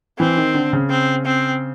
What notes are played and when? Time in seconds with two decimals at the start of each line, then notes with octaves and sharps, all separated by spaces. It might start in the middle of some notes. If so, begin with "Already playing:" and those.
0.19 E3 C4
0.37 D#3
0.54 D3
0.73 C#3
0.90 C4
1.26 C4